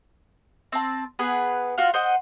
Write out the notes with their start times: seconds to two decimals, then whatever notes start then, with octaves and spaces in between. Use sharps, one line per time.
0.72 C4 A5
1.19 B3 G#4 B4 F#6
1.78 F4 F#4 F5
1.94 C5 D#5 F#5